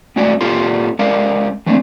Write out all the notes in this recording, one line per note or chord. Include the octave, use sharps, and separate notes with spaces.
G#2 G#3 A3 C#4 F#4 D5
A#2 C#4 F4 G4 A4 C6
G#3 C#4 A#4 D5 F5
E3 A3 A#3 C4 D4